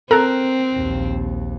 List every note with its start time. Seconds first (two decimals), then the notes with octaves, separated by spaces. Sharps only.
0.11 C4 A4 A#4 A#5 F#6
0.74 A#1 D#2